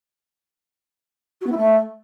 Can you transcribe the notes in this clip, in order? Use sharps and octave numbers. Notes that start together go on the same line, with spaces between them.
F#4
B3
E4
A3